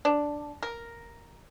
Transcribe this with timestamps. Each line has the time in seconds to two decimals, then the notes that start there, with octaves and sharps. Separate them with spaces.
0.05 D4
0.63 A#4